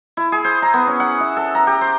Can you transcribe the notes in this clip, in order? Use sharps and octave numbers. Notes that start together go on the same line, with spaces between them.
E4
G#4
C5
A#5
B3
C#4
F#5
E5
A4
A#5
G4
C5